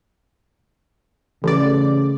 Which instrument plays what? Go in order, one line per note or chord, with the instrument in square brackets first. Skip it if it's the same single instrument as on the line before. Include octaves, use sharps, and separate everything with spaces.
[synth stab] A1 D5 [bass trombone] C#3